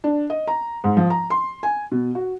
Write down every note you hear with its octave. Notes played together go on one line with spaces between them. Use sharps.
D4
D#5
A#5
G#2
F3
A#5
C6
G#5
B2
F#4